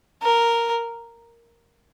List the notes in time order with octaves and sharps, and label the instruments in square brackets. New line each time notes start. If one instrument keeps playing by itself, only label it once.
[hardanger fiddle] A#4